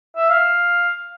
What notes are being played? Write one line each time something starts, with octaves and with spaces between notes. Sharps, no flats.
E5
F5